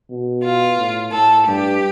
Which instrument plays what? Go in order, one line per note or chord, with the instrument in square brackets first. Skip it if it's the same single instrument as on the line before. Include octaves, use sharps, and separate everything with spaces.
[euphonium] B2
[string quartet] F4
[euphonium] A2
[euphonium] A2 [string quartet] A4
[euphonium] G2 [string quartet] G4